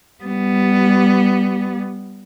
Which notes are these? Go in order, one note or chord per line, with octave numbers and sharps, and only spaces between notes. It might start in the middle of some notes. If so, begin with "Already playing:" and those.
G3 B3